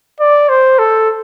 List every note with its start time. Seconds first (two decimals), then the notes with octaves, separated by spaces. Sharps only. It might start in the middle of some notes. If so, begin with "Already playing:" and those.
0.20 D5
0.49 C5
0.79 A4